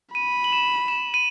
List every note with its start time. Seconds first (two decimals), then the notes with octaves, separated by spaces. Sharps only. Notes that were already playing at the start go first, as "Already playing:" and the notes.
0.15 B5 D#7
0.44 F#7
0.53 E7
0.88 E7
1.14 D#7